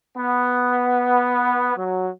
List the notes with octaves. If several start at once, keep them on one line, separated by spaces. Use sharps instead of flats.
B3
F#3